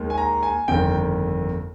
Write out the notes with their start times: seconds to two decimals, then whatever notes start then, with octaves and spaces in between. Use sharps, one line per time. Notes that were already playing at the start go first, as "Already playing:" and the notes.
Already playing: D#2 D#3 G#3
0.10 G#5
0.18 A#5
0.43 G#5
0.68 G1 F2 D#3 A#3 G5